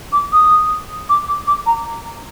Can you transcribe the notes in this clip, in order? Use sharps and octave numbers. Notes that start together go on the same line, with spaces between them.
D6
D#6
D6
D6
D6
A#5